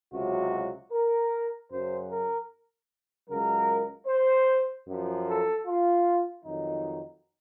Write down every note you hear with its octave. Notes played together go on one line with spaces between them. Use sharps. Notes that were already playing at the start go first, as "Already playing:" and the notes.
C#2 C3 F#3 F#4
A#4
F#2 C#3 F#3 C5
A#4
C#2 C#3 F#3 A#4
C5
F#2 F3
A4
F4
F2 D#3 F#3 D#4